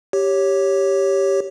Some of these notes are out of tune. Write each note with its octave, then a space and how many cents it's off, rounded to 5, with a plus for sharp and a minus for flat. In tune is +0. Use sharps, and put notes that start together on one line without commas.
G4 +0 C#5 +0